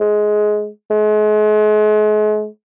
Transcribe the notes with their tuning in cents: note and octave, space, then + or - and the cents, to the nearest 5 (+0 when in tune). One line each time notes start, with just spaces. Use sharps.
G#3 +15
G#3 +40